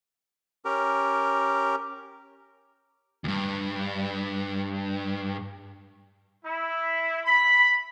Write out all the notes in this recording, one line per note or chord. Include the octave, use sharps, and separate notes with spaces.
C#4 G4 A#4
D2 G2
E4
B5